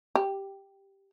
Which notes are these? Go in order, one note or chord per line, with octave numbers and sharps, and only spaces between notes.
G4